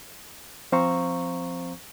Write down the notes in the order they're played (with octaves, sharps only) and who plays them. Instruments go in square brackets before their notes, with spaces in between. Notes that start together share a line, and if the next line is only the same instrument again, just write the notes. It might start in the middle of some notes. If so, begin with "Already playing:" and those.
[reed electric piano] F3 C4 C5 F5 A#5 C#6